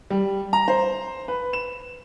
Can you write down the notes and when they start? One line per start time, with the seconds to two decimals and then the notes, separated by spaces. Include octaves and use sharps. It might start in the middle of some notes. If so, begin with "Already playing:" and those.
0.10 G3
0.53 A#5
0.68 C5
1.28 B4
1.53 E7